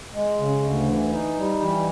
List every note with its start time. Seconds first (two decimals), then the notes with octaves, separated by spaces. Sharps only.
0.14 G#3
0.39 C#3
0.63 D2
0.88 E3
1.12 D#4
1.37 G3
1.61 E3